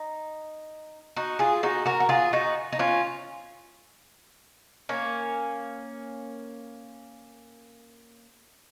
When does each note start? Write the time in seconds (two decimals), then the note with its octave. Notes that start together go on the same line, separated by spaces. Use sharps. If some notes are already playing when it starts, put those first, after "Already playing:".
Already playing: D#4
1.16 D#4 F#4
1.39 F4 G#4
1.63 D#4 F#4
1.86 F#4 A#4
2.00 F#4
2.09 F4 G#4
2.33 D#4 F#4
2.72 D#4
2.79 C#4 F4
4.89 A#3 C#4